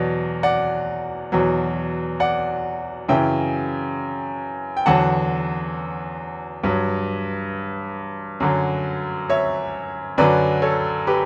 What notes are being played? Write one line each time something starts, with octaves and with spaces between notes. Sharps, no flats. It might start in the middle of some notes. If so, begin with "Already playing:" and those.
Already playing: E2 B2 F#3 D5
D5 F#5
E2 B2 F#3
D5 F#5
F#2 C#3 E3 E5 G5
G5
E2 D3 F#3 F#5 A5
G2 F#3
F#2 D3 F#3
C#5 E5
F#2 D3 F#3 B4 D5
A4 C#5
G4 B4